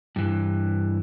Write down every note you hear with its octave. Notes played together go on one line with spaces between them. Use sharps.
G2 E3